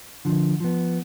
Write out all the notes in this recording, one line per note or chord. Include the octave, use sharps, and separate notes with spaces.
D3 F3
F3 B3